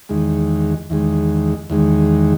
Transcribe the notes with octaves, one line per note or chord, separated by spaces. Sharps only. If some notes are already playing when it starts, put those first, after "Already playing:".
E2 D#3 G#3
E2 D#3 G#3
E2 D#3 G#3